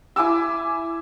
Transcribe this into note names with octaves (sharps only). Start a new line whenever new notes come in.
E4 G#5 D6 E6